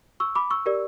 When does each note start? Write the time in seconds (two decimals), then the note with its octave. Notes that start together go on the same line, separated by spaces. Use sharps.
0.20 C#6 E6
0.35 B5 D6
0.51 C#6 E6
0.66 G4 A#4 D5